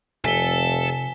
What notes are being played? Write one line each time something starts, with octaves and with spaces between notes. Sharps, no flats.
F1 C3 A4 G#5 B6 G7